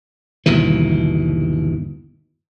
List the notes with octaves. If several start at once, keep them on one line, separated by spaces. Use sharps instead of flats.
G1 D#2 B2 E3